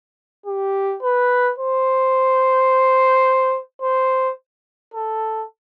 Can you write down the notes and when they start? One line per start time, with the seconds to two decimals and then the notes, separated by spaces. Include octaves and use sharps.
0.47 G4
1.02 B4
1.59 C5
3.82 C5
4.94 A4